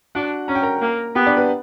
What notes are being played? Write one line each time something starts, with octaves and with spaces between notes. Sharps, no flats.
D4 F#4 F#5
C#4 A#5
G5
A#4 A#5
A#3
B3 G4 G5
D4 D5
B3 B4